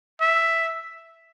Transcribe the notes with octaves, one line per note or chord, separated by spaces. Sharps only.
E5